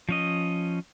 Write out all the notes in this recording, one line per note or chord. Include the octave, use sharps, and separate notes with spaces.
F3 C#4 D#5